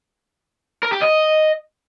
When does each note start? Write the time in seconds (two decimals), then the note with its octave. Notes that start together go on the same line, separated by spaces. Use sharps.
0.83 A#4
0.92 G4
1.02 D#5